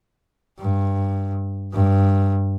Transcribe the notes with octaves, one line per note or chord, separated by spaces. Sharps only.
G2
G2